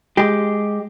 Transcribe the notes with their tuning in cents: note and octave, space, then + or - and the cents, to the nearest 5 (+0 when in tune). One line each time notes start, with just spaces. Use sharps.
G#3 +0 G4 +0